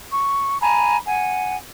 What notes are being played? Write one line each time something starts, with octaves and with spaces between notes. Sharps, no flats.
C#6
G#5 A#5 B5
F#5 G#5